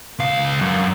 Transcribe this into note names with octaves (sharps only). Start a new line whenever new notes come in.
C#2 F5
F#2